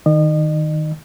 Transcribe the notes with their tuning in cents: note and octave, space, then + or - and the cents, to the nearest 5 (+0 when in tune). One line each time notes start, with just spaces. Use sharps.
D#3 +0 D#5 -35